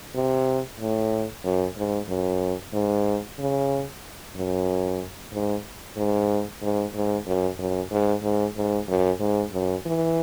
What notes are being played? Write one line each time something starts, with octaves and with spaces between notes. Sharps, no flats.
C3
A2
F#2
G#2
F#2
G#2
C#3
F#2
G#2
G#2
G#2
G#2
F#2
F#2
G#2
G#2
G#2
F#2
G#2
F#2
E3